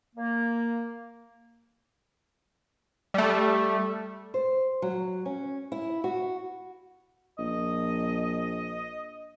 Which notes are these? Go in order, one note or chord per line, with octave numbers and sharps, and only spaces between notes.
A#3
G3 A3
C5
F#3
C#4
E4
F#4
A#1 D#5